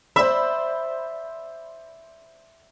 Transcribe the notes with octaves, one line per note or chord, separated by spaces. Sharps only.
C5 D5 E5 B5